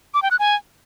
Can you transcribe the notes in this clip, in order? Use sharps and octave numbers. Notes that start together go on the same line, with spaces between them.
D6
G5
F#6
G#5